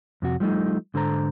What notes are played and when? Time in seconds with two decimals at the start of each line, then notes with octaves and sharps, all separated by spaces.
0.22 F2 C3 F#4
0.40 F3 G3 A3 D#4
0.94 G#2 D3 A4 C5 A#5